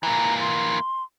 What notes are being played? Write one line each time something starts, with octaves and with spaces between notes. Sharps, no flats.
E3 A#3 A#5
C6